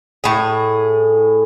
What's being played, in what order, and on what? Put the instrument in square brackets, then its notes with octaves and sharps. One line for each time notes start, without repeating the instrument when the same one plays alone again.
[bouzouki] A2 G#4